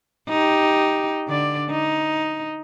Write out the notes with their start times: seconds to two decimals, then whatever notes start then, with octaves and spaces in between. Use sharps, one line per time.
0.29 D#4 G4
1.28 D3 D5
1.71 D#4